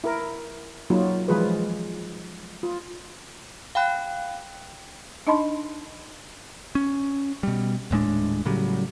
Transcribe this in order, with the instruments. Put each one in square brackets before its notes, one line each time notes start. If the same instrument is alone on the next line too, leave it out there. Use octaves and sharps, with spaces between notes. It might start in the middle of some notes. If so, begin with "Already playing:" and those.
[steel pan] E4 A#4
F#3 A#3 D#4 F4
E3 F3 G#3 F4 G#4 B4
F4
[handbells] F5 G5 B5 F#6
[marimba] D4 D#4 D#5 A5 B5 C6
[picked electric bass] C#4
B2 G3
D#1 A2 G#3 D4
A2 C#3 F#3 G3